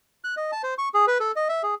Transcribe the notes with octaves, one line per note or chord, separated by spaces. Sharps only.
F#6
D#5
A5
C5
C#6
G#4
B4
A4
D#5
E5
G#4